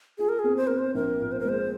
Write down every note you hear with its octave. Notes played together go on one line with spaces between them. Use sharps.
F4 G#4
A#4
C4 G#4
C5
C4 A#4
C5
A#1 A#4
A#2
C5
A#4
G#3 C5